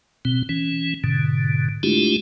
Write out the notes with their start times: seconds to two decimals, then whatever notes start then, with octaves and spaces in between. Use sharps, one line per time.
0.25 B2 C4
0.49 E3 C#4
1.04 G#2 B2 D3
1.83 G#3 A3 D4 E4 F4 G4